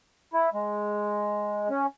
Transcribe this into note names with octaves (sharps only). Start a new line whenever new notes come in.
E4
G#3
C#4